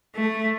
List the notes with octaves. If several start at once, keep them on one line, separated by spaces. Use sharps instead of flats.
A3